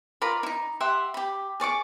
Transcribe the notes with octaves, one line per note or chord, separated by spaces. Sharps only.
F4 A#4 D5 B5
D#4 E4
G4 E5 F#5 C6
G4 B5
G#4 D5 C#6 D6